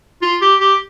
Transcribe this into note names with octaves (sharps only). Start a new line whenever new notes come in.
F4
G4
G4